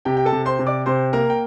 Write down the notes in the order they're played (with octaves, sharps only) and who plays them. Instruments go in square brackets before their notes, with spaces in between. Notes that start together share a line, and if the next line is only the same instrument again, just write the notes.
[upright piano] C3 [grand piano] G4 G5
[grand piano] G5
A4 A5
[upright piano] C3
[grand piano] C5 C6
[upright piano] C3
[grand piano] D5 D6
[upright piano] C3 [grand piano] C5 C6
[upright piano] A#3 [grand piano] A#4 A#5
[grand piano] G5